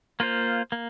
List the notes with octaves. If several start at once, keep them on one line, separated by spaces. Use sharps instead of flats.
A#3 F4 C5
A#3